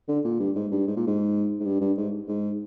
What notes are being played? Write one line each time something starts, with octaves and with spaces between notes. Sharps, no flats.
D3
A#2
G2
G#2
G2
G#2
A#2
G#2
G#2
G2
G2
G#2
G#2